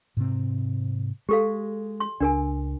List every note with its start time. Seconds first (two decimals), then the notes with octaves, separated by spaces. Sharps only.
0.17 G#2 C3 C4
1.29 G#3 G4 A4 F5
2.00 C6
2.20 C#2 D4 A#4 G#5